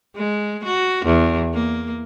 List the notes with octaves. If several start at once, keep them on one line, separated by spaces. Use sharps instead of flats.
G#3
F#4
E2
A#3